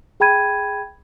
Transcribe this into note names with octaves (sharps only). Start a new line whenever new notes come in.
G#4 G5 B5 G#6 D#7